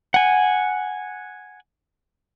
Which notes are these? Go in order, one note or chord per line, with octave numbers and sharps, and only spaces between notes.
F#5 G#5